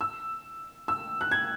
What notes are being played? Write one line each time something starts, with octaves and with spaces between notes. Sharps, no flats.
E6
E6
F#6
G#6